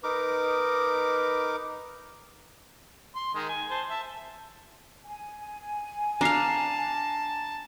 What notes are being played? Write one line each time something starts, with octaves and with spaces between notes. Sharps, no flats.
D#4 A#4 B4 D6
C6
D#3 G#3
G#5
C5 A5
E5 A5
G#5
D4 F5 A5 A#5 C7